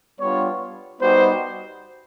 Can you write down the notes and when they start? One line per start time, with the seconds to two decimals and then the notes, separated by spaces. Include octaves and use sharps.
0.20 G3 B3 D4 F4 C#5
1.01 G3 B3 D#4 F#4 C5